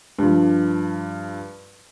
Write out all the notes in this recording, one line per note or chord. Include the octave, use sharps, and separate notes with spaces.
G2 F3